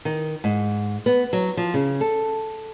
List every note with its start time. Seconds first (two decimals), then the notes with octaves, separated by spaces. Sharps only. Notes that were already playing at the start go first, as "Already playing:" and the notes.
0.05 D#3
0.44 G#2
1.06 B3
1.33 F#3
1.57 F3
1.74 C#3
2.01 A4